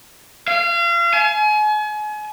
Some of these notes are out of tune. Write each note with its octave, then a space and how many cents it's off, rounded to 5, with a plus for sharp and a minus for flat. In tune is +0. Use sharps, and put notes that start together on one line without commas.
F5 -35
G#5 +35